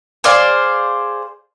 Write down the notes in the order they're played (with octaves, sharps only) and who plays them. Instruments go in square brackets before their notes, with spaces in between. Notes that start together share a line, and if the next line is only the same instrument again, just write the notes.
[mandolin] G#4 C5 D5 F5